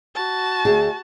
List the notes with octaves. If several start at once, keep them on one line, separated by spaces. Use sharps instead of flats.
F#4 A5
D2 G#4 G#5